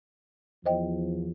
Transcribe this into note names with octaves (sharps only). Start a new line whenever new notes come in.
E2 F3 C5 D#5 G5